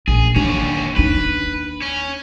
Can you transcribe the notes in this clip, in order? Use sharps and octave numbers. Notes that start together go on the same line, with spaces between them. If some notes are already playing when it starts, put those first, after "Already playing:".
A#1 G#4
D#2 D3 C#4
D#2 D4 B4
C#4